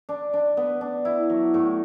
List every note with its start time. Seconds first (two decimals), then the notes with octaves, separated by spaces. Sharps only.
0.09 D4
0.33 D4
0.57 B3
0.81 D4
1.05 E4
1.30 F#3
1.54 A2